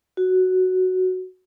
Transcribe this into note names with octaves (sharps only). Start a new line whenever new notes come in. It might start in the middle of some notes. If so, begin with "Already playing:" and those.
F#4